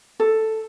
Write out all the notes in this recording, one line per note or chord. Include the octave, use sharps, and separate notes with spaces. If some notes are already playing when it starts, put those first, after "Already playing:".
A4